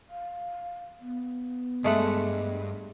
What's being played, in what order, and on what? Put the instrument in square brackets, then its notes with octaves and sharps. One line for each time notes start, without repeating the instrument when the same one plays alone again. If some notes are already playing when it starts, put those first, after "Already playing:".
[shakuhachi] F5
B3
[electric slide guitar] G2 [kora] G#3 A3 F#5